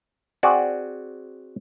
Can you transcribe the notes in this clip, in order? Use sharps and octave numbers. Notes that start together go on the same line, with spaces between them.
C4 F#4 G#4 D5